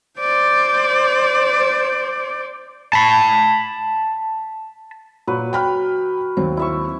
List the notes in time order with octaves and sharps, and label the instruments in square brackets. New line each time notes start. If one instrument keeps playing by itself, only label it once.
[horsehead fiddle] C5 D5
[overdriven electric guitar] A5 B5
[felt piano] A#2 [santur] F#3 B4
[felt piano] G5 B5 F6
D#2 F#3 C4
[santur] E4 E5 C#6